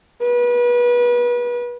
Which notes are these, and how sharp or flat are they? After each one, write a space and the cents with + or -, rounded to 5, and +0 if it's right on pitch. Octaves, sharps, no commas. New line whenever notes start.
B4 -30